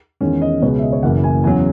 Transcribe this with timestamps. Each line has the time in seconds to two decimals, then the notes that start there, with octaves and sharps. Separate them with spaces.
0.21 E2 D#3 G#3 C#4
0.42 D#5
0.61 C#2 B2 G#3 B3 C#5
0.79 E5
0.83 D#5
0.92 C#5
1.03 F#1 F#2 E3 A#3 F#5
1.24 G#5
1.44 E2 C#3 F#3 C#4 G#5